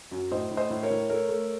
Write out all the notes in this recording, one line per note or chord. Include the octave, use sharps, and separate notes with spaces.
F#2
A2 C5 D#5
A2
C5 D#5
A2
A#4 C#5
A2
A3 A#4 C#5
A3